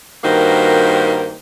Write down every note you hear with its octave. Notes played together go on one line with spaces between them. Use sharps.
G2 D#3 A#3 F#4 C5